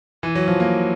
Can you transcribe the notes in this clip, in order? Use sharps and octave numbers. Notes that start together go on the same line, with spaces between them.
E3
F#3
F3
A#3